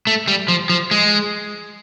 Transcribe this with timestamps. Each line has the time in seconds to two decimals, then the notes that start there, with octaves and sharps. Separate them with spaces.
0.07 A3
0.28 G3
0.48 F3
0.70 F3
0.91 G#3